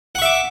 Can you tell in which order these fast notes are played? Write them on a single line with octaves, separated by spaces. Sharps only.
F#5 C#6 E5 D6